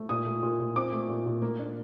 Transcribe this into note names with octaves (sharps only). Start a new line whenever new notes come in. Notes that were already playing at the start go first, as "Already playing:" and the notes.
Already playing: A3
A#2 D#6
A3
A#2
A#2
C4 D6
A3
A#2
A#2
A#3
D4